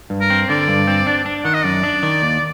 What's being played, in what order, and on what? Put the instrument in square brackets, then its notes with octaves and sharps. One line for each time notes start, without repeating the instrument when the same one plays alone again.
[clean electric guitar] G2
[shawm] A#4
[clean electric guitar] C4
[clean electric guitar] D3 [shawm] D5
[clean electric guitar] G2
C4
D4
D4
[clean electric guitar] D#3 [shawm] F#5
[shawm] D#5
[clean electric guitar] F#2 [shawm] D5
[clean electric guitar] D4
D#3
D#2